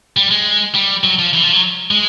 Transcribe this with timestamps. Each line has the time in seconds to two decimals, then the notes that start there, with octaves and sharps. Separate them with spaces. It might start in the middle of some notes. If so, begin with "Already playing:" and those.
0.17 G3
0.31 G#3
0.75 G3
1.04 F#3
1.19 F3
1.33 E3
1.43 F3
1.53 F#3
1.91 G#3